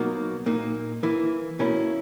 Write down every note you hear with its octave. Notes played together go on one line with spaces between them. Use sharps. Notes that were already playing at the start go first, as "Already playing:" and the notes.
Already playing: B2 F#3 A#3 D#4 F#4
A#2 A#3 D#4
E3 A#3 E4
B2 A#3 C#4 E4